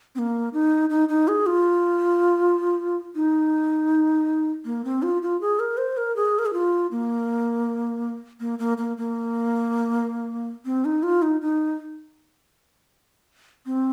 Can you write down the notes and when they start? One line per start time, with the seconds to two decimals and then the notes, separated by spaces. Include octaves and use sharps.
0.15 C4
0.19 A#3
0.53 D#4
0.90 D#4
1.09 D#4
1.28 G#4
1.46 F4
3.15 D#4
4.65 A#3
4.85 C4
5.02 F4
5.22 F4
5.41 G#4
5.59 A#4
5.78 C5
5.97 A#4
6.16 G#4
6.39 A#4
6.46 G#4
6.53 F4
6.91 A#3
8.40 A#3
8.59 A#3
8.78 A#3
8.97 A#3
10.65 C4
10.85 D#4
11.03 F4
11.22 D#4
11.41 D#4
13.66 C4